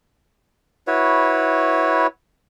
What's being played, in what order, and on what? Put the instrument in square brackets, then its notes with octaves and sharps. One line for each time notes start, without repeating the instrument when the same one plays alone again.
[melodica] E4 F#4 B4 C#5